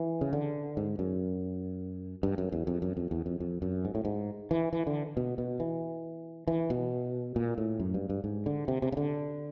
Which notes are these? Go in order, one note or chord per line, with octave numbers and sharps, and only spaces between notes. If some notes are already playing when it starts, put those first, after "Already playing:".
Already playing: E3
C#3
D3
G#2
F#2
G2
F#2
E2
F2
F#2
F2
E2
F2
F2
F#2
G#2
A2
G#2
E3
E3
D3
B2
B2
E3
E3
B2
A#2
A2
F#2
G2
G2
G#2
D3
C3
C3
C#3
D3